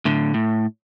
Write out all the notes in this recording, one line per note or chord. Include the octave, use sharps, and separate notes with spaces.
A2 D3
A2